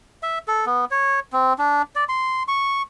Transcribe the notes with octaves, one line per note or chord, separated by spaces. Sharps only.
E5
A4
B3
C#5
C4
D4
D5
C6
C#6